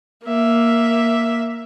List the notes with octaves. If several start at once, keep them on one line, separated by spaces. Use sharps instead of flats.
A#3 E5